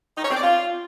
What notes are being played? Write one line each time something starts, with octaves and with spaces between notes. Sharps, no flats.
D#4
C#5
C4
D5
F4